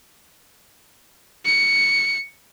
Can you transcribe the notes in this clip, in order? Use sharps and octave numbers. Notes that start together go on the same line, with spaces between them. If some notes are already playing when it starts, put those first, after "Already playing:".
C#7